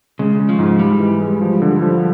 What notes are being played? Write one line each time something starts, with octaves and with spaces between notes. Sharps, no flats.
C#3 G#3
G#3
F3
G#2
G3 G#3
E3
G#3
F3
D3
F3